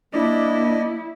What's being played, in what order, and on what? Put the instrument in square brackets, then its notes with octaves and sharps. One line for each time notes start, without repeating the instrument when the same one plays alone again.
[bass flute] A#3 [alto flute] D4 [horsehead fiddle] E4 [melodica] D5 D#5